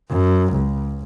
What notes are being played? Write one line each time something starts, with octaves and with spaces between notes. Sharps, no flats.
F#2
C#2